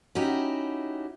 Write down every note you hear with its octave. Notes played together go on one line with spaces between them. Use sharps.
C#4 D#4 E4 F#4 G4